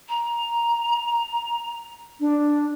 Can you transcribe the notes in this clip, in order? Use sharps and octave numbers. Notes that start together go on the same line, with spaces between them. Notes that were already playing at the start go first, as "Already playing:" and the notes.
A#5
D4